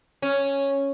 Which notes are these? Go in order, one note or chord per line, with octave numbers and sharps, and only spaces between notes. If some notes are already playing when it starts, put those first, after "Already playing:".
C#4